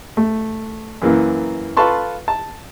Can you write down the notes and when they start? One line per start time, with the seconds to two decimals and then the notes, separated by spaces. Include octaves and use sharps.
0.17 A3
1.02 F#2 E3 A#3
1.77 F4 A4 B4 A5 C6 C#6
2.28 A5